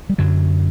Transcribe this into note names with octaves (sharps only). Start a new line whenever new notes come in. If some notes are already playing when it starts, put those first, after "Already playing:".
G3
F#2 D3 F#3